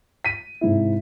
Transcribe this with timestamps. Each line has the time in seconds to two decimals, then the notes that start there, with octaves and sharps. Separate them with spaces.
0.25 B6 D#7
0.61 G#2 C3 E4